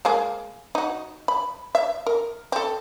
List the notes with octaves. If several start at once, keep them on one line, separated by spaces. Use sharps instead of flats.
G#3 A#3 G#4
D#4 F#4
B5
E5
A#4
C4 A4